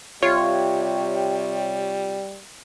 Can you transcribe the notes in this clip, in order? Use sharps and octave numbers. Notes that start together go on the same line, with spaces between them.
C3 G3 F4 C#5